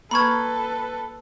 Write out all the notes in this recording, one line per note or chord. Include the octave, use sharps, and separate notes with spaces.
A#3 A4 B4 B5 C#6 F6 G#6